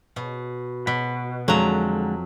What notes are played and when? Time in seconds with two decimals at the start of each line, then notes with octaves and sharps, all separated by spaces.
0.16 B2
0.87 B2 B5
1.48 F2 D3 F#3 G#3 A#5